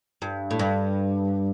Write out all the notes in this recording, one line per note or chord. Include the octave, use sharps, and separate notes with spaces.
G2
A2
G2